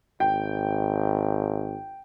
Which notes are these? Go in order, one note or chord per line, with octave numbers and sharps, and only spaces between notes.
G#1 G5